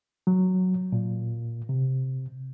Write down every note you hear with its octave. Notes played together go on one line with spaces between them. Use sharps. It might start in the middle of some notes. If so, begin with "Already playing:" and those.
F#3
A#2
C3